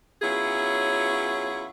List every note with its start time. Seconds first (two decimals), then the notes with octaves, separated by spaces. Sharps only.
0.22 F#3 B3 C#4 E4 F4 G#4